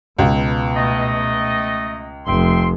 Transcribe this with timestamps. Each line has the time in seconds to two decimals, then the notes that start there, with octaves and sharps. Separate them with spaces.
0.19 C#2 B2
0.75 A3 D#5
2.26 F1 E5 G5 C6